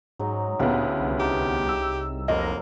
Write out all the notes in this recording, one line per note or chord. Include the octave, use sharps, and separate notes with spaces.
G#2 F#3 G#3 D#4
D2 A#2 C#3 B3 E4 G4
C2
D#4 G4
E6
F1 F#3 A#3 D#5